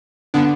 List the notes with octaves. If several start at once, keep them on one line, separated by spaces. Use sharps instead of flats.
D3 B3 D4